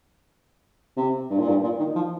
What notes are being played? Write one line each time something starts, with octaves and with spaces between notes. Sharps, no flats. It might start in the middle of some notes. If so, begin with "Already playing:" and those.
C3
G2
A#2
G2
A#2
D#3
F3